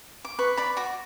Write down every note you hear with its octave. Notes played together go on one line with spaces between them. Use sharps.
D6
B4 C#6
D5 B5
F#4 D6